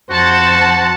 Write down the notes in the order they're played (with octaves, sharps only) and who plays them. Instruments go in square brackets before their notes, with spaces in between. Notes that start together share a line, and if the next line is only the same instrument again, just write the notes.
[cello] F2 F#5 [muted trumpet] F#4 [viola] C5 [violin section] A5